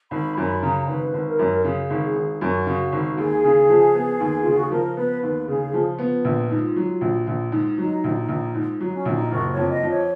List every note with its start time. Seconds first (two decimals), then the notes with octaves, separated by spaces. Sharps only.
0.11 G#1 B5
0.37 F#2 B5
0.62 C#3 A#5
0.88 G#1 B4
1.14 G#1
1.27 A#4
1.39 F#2
1.64 C#3 G#4
1.90 G#1
1.98 A#4
2.03 G#4
2.15 G#1
2.41 F#2 F#4
2.67 C#3
2.92 G#1
3.18 D#2 G#4
3.44 C#3
3.69 F3
3.94 B3
4.20 D#2
4.42 C#3 F4
4.52 F#4
4.62 G#4
4.71 F3 A#4
4.97 B3 B4
5.22 D#2 B4
5.48 C#3 G#4
5.74 F3
5.86 F4
5.99 B3
6.25 A#1
6.51 G#2
6.76 F#3
7.01 A#1
7.27 A#1
7.52 G#2
7.78 F#3 D#4
8.04 A#1
8.16 D#4
8.29 A#1
8.55 G#2
8.74 D#4
8.81 F#3
8.93 C#4
9.05 A#1
9.12 D#4
9.32 F#1 F#4
9.50 C#5
9.57 F2
9.70 D#5
9.83 F3
9.89 C#5